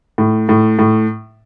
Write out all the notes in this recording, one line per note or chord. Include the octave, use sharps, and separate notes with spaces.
A2
A2
A2